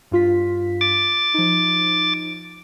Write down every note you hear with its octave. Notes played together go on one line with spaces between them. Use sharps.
G2 F4 B6
D6 A6
F3 D#4